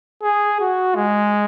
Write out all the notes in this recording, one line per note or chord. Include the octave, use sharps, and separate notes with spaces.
G#4
F#4
G#3